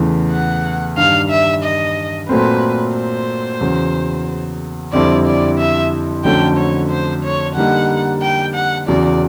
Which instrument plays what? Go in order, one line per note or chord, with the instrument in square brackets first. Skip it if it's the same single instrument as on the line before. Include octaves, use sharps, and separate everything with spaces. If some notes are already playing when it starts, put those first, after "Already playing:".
Already playing: [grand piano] E2 C#3 E3 A3
[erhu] F#5
[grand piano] G2 D#3 G3 [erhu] F5
[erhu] E5
D#5
[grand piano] A#2 F#3 A3 C4 [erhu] B4
[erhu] C5
[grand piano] E2 C#3 F#3
[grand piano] F2 D3 G3 C4 E4 [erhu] D5
[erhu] D5
E5
[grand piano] F2 D3 F#3 A3 C#4 [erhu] G5
[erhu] C#5
C5
C#5
[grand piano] D3 G3 A#3 D#4 [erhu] F#5
[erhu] G5
F#5
[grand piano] E2 C#3 F#3 [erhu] D5